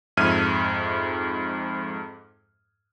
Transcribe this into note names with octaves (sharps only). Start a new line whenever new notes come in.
F2 G#2 E5 F6 G#6 D#7